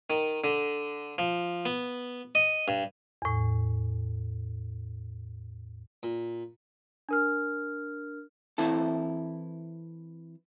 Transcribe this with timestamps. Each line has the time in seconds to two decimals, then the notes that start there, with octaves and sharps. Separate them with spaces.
0.10 D#3
0.44 D3
1.18 F3
1.66 B3
2.35 D#5
2.68 G2
3.22 E2 A2
6.03 A#2
7.09 D4 A#4 F6
8.58 E3 C4 E4 A4